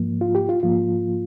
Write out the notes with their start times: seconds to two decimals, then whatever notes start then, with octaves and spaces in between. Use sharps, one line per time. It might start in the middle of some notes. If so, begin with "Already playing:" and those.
Already playing: G#2 F3 A#3
0.21 F4
0.35 G4
0.49 F4
0.63 G#2 F3 A#3 F4